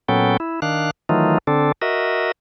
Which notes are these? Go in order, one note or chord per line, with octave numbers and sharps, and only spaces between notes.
A#2 F#3 B3 C#4 A4 G5
E4
D#3 D4 F5 F#6
D#3 E3 F#3 A3 D#4 F4
D3 C4 D4 A4
F#4 A#4 D#5 E5